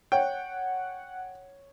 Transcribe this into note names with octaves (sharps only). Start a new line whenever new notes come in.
C#5 F#5 G5